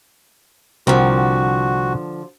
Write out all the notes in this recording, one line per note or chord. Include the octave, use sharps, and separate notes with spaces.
C2 D3 F3 C4 F#4 A#4